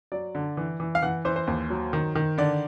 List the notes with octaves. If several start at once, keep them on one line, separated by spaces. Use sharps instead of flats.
F#3 D5
D3
E3
E3
F5
E3 F#5
E3 C5
C5
D#2
F#3
D#3
D#3
D3 D5